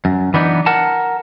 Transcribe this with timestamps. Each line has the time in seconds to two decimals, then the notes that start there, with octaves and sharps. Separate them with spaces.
0.05 F#2
0.34 E3 B3 D4 D#4
0.66 A#4 F#5 A5